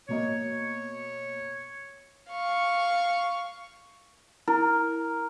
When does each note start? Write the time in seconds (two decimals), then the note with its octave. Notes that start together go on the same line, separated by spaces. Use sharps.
0.09 B2 A#3 C#5 D#5
2.31 F5 C#6
4.48 E4 A#4